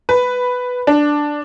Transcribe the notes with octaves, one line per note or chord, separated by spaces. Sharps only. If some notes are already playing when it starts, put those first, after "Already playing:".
B4
D4